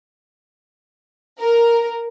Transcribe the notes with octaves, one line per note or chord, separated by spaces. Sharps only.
A#4